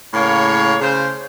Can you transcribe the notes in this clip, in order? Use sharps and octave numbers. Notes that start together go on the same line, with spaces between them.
A2 C#3 A#3 C#5
C#3 C5